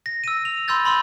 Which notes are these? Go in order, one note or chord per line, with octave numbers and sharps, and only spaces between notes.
A#6
E6 D#7
F7
B5 C6 E6 G6 A6
B5 C6 E6